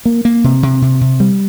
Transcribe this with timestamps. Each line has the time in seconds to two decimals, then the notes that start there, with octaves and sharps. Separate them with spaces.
0.05 A#3
0.25 A#3
0.44 C3
0.63 C3
0.82 C3
1.01 C3
1.20 G3